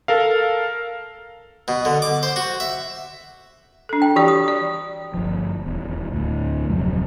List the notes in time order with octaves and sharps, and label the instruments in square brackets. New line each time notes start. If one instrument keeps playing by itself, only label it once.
[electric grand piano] A4 A#4 F5
[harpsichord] B2
D3
D6
C5
F#4
E5
[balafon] D4 A4
[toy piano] G5
[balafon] E3 G4 D5 [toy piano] F#4 D#6
[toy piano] D#6
[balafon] D5
[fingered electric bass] G1 F3
D#1 E2
D2 A2
D1 F2 C3 F#3